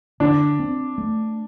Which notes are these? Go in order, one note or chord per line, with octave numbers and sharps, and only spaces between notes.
D3 D4
C4
A3